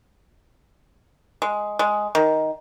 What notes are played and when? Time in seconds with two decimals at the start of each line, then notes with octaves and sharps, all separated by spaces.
1.42 G#3
1.79 G#3
2.15 D#3